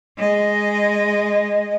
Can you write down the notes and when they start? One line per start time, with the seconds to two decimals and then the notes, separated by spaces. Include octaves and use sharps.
0.17 G#3 D#5